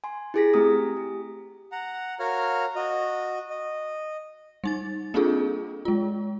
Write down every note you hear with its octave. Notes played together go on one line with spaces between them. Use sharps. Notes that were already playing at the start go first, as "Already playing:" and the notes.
G#5 C6
E4 G4 G#4 G#5 A#6 B6
A3 C4 G4 G#5 A#5 D#6
G4
F#5 A#5
F#4 A#4 C#5 F5 A#5 F6
F#4 D#5
D#5
G3 D#4 A6
A#3 C4 D4 F4 G#4 A4
G#3 F4